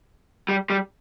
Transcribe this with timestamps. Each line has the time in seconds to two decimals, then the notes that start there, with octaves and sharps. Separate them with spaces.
0.49 G3
0.70 G3